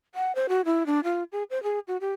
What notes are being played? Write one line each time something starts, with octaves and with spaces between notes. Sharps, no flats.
F#5
C5
F#4
E4
D4
F4
G#4
C5
G#4
F#4
G4